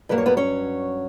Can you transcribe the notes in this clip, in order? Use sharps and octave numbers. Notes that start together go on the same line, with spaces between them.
G2 F#3 A#3 B4
C#5
B3 B4
C#4 C#5